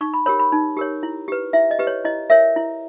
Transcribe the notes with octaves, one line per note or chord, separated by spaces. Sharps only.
D#4 C#6
B5
G4 A#4 C#5 B5
B5
D#4
G4 A#4 C#5
E4
G4 B4
E4 E5
D#5
G4 B4
C#5
E4 D#5
A#4 C#5 E5
E4